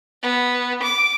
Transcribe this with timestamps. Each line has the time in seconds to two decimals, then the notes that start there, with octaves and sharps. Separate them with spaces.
0.23 B3
0.83 D6